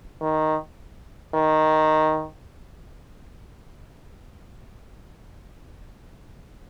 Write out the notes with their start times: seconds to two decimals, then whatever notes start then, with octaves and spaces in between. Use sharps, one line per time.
0.22 D#3
1.35 D#3